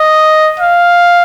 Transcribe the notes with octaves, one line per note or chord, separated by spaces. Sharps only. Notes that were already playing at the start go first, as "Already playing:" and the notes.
Already playing: D#5
F5